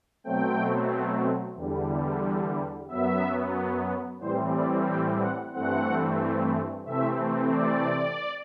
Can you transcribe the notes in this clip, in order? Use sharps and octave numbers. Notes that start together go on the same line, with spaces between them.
B2 F#3 A3 C4 G5
E2 D3 G3
F#2 F#3 B3 E5
A2 E3 G3 C4 C5
D5
G5
F#5
G2 E3 A3 C4 F#5
C3 E3 A3 C4 E5
D5